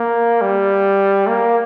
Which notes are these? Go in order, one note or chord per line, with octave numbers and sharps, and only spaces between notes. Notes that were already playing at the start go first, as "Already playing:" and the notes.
Already playing: A#3
G3
A#3